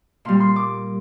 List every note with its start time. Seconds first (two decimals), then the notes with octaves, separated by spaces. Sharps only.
0.25 A#2 G3 C6
0.40 C6
0.56 D6